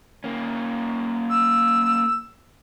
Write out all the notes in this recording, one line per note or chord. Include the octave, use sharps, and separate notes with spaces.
A#3 C#4
E6